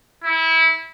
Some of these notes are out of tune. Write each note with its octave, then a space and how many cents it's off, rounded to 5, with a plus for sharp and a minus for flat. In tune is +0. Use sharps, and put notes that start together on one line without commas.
E4 -20